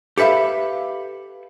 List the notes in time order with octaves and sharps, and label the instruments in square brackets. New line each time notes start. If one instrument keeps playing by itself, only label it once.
[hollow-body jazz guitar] G4 A4 B4 E5 F5